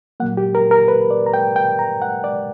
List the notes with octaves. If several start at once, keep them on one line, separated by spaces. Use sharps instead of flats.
A#2 F#3 A#3 F#5
G4
A#4
A#4
B4
D5
A#5
G5
G5
A#5
F#5
D5